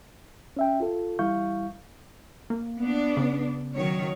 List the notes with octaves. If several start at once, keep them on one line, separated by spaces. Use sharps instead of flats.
C#4 E5 G5
F4 A4
E3 G3 E4 F5 C#6 G6
A#3
B3 D4
C#3
D#3 F#3 C#5